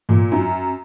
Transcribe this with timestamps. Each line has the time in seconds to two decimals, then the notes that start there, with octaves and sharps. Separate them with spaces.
0.09 A#2
0.32 F#2